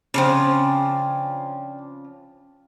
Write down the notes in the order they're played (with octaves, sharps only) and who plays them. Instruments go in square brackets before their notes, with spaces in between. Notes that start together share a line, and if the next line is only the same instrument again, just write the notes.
[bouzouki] C#3 E3 F3 [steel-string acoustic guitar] C4 D4